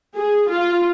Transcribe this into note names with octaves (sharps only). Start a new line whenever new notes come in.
G#4
F4